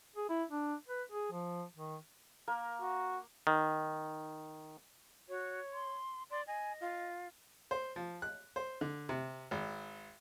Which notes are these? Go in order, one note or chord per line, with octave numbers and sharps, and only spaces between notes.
G#4
E4
D4
B4
G#4
F3
D#3
A#3 A#4
F#4
D#3
F#4 C#5
C6
D5 C6
D#5 G#5
F4
C5
F3
F#6
C5
D3
C3
G#1